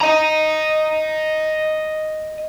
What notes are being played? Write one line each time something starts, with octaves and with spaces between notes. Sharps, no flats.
D#5 A#5